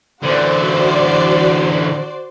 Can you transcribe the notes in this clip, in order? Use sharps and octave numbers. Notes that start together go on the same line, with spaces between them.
D3 E3 F#4 C5 D5